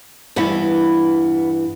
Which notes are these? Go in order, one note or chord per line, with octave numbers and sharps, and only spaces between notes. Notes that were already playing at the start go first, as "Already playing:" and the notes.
G2 E3 B3